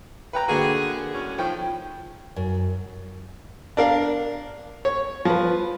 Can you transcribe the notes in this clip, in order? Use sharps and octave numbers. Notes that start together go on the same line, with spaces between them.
B4 G5 A#5
D3 A#3 F#4 G#4
A2 F#3 C#4
A2 D#3 F3 G5
F#2
D4 A#4 F5
C#5
F3 B4